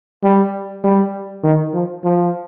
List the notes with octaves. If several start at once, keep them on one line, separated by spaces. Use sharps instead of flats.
G3
G3
D#3
F3
F3